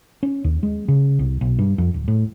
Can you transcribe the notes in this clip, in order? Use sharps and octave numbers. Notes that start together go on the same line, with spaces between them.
C#4
D#2
G#3
C#3
C2
B1
G2
F2
D1
A2